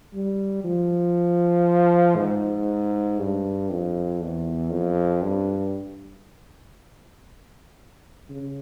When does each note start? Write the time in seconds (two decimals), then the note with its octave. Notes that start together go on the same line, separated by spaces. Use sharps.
0.13 G3
0.64 F3
2.17 G#2
3.19 G2
3.70 F2
4.22 E2
4.72 F2
5.23 G2
8.30 C#3